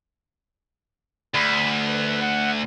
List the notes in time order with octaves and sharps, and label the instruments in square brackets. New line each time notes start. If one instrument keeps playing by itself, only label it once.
[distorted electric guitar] D2 [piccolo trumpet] B5
[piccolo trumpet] B4
F#5